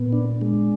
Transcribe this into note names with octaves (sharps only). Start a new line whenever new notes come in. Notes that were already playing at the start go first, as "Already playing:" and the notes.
Already playing: A#2 B3
D4
G#3